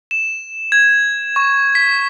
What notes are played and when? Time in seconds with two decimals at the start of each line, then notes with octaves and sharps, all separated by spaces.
0.11 E7
0.72 G#6
1.36 C#6
1.75 B6